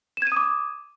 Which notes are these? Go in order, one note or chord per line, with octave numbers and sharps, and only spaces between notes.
D6 D#6 G#6 D#7 E7